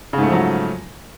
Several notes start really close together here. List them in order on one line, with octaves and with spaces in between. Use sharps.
C#3 G#2 A3 F3 F#3